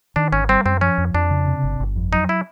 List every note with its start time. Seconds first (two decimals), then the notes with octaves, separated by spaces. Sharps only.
0.16 D#3 D4
0.32 G#1 C#4
0.49 G3 C4
0.65 F#2 C4
0.81 F3 C#4
0.98 F2
1.14 F2 D4
1.31 C#3
1.47 C3
1.64 G1
1.80 G1
1.96 F2
2.13 F#3 D#4
2.29 E4